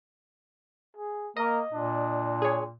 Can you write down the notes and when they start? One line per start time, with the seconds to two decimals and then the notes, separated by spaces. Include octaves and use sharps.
0.97 G#4
1.37 A#3 A#4 D#5
1.73 A#2 D4
2.42 G#4 C#5